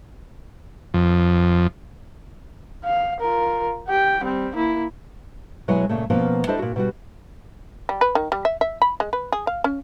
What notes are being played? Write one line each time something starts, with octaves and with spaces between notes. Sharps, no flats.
F2
F5
F4 A#4
G4 G5
G3 C4
A#3 E4
B2 F#3 G#3 E4 C#5 G#5
A#2 C#3 A3
B2 F3 A#3 B3 C#4
D4 E4 A4 C5 D#5
A#2 F#4
B2 G3 F#4
G3
B4
D#3
G3
E5
E5
B5
G#3
B4
G#4
F5
C#4